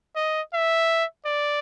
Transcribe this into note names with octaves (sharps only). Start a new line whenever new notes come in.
D#5
E5
D5